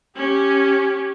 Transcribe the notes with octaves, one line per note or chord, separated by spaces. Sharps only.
C#4 G4